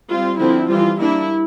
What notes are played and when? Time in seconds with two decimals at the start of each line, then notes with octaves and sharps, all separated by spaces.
0.10 G3 C4 F4
0.40 D3 F3 C4 E4
0.69 E3 G3 C4 F4
0.99 G3 A#3 D4 E4